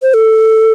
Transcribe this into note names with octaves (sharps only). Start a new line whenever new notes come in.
C5
A4